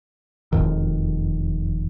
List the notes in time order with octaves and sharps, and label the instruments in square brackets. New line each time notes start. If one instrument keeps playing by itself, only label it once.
[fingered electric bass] E1 F2 D#3